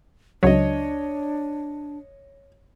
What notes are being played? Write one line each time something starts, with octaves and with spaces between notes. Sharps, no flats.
C#2 F#3 D4 C#5 D#5